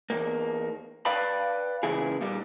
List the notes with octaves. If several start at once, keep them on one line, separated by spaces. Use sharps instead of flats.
E2 G2 A#3
B4 D5 F5 G5 A5 B5
C#2 A#2 C#3 E3 E4 G#4
A#2 G3